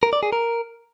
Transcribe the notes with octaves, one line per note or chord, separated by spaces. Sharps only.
A#4
D5
G#4
A#4